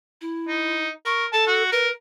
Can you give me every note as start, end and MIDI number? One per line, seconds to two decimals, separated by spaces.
0.21 0.85 64
0.48 0.90 63
1.06 1.27 70
1.06 1.26 85
1.33 1.63 69
1.33 1.43 81
1.47 1.70 66
1.72 1.89 70
1.72 1.92 71